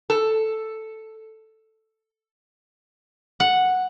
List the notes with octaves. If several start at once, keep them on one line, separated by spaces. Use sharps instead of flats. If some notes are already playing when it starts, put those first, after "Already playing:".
A4
F#5